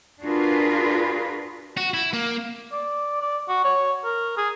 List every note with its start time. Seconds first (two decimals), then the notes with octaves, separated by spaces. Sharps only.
0.23 D4 F4 F#4 G#4 A#4 B4
1.77 F#4
1.94 E4
2.13 A#3
2.72 D5
3.21 D5
3.49 F#4
3.64 C#5
4.04 A#4
4.37 G#4